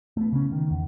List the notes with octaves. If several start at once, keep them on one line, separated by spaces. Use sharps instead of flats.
A3 B3
C#3 C4 C#4
D#3
E2